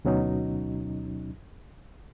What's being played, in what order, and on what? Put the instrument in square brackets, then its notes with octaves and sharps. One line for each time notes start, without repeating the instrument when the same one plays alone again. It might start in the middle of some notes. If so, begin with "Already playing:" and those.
[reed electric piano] D2 B2 F#3 C#4 D#4